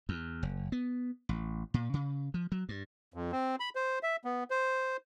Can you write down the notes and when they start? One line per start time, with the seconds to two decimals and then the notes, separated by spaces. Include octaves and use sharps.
0.09 E2
0.43 F#1
0.72 B3
1.29 A1
1.74 A#2
1.94 C#3
2.34 F3
2.52 F#3
2.69 G2
3.14 F2
3.32 C4
3.60 B5
3.75 C5
4.03 E5
4.25 B3
4.50 C5